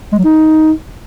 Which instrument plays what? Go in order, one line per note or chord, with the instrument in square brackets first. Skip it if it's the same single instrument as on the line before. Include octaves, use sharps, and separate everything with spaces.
[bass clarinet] G#3
F#3
D#4